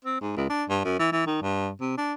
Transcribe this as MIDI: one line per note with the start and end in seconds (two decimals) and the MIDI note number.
0.05 0.19 60
0.21 0.35 44
0.36 0.45 37
0.50 0.64 62
0.69 0.80 43
0.85 0.98 42
1.00 1.07 52
1.12 1.25 52
1.27 1.37 51
1.42 1.70 43
1.81 1.94 48
1.97 2.14 62